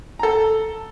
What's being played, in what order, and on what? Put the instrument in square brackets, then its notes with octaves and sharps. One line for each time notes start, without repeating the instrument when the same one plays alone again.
[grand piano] A4 A#5